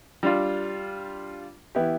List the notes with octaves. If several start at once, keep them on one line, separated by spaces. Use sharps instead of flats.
G3 D4 F4
E3 B3 E4 G4